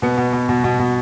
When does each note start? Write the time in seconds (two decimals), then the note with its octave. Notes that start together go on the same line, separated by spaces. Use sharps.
0.02 B2 B3
0.18 B2
0.33 B2
0.49 B2
0.64 B2
0.79 B2